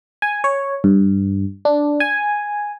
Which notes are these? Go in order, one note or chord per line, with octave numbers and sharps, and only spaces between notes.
G#5
C#5
G2
D4
G#5